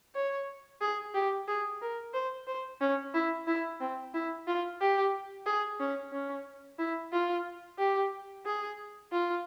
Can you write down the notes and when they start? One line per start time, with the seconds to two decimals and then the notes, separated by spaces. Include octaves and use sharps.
0.15 C#5
0.81 G#4
1.15 G4
1.48 G#4
1.82 A#4
2.14 C5
2.47 C5
2.81 C#4
3.14 E4
3.47 E4
3.81 C4
4.14 E4
4.47 F4
4.81 G4
5.46 G#4
5.80 C#4
6.13 C#4
6.79 E4
7.13 F4
7.79 G4
8.46 G#4
9.12 F4